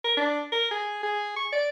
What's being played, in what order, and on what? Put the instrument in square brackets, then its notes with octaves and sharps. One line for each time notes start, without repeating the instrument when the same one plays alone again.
[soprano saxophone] A#4
D4
A#4
G#4
G#4
C#6
D5